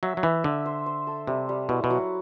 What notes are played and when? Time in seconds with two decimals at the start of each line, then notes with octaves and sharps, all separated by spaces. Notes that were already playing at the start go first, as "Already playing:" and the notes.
0.03 F#3 E5
0.17 F#3
0.23 E3 E5
0.44 D3 E5
0.66 C5
0.86 C5
1.07 A4
1.27 C3 G3
1.49 G3
1.69 B2 E4
1.84 B2
1.90 F#3